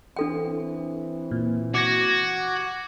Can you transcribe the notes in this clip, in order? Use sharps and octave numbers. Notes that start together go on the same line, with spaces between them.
E3 C4 D4 A4 G5
A#2
F#4 D6 G#6 A#6